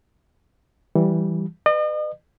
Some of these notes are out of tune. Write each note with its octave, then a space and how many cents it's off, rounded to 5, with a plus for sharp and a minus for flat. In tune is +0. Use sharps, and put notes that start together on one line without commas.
E3 +0 G3 -10
B4 +20 D#5 -40